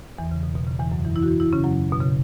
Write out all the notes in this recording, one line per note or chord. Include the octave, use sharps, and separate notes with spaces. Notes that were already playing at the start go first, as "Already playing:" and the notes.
E2 E3
C#3
B2
B2
C#3
E2 E3
F#2 F#3
E3 E4
E3 E4
F#4
E3 E4
E3 E4
C#3 C#4
F#2 F#3
B2
C#3